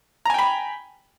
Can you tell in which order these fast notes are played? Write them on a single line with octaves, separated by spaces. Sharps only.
A#5 G#5 G5 B5